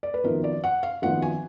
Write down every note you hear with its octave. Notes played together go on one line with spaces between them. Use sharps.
D5
B4
G#1 F#2 F3 B3 D#4 A#4
D5
F#5
F5
G#1 F#2 F3 B3 D#4 F#5
G#5